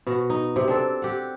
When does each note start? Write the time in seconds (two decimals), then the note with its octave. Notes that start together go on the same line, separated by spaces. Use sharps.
0.07 B2 F#4
0.30 D#4
0.56 C3
0.68 C4 D4 A4
1.02 G4 F#5